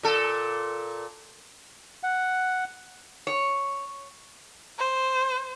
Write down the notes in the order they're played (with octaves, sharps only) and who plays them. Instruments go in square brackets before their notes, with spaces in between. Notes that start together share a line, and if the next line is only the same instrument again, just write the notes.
[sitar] A#2 A4
[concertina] F#5
[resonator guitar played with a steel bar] C#5
[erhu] C5